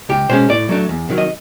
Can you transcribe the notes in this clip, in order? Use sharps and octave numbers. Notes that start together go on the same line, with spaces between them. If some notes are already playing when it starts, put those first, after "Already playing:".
C#2 G4
B2 G#3 C#4 C5
A2 D5
F#3 A3 D4
E2
C3 D#3 F#3
D#5